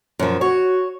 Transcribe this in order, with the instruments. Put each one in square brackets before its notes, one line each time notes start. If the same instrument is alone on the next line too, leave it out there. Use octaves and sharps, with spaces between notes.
[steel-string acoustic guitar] F#2 F3
[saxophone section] F#4 [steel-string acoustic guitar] C#5